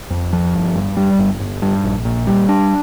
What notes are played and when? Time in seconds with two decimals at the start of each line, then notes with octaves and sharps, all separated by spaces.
0.10 F2
0.33 F3
0.54 G1
0.75 G2
0.97 G3
1.19 G1
1.40 G1
1.62 G2
1.84 A#1
2.05 A#2
2.27 G3
2.49 D4